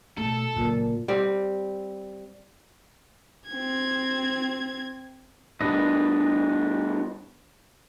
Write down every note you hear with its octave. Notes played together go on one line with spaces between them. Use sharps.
B2 A3 A4
F#1 A#2
G3 C4
C4 G#6
G2 B2 D4 B4 D#5